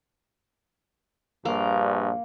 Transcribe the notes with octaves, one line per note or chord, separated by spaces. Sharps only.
A#1 G2 A#3